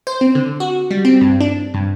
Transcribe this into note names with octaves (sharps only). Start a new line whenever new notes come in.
C5
C4
D3
F#4
G3
C4
G2
D4
G2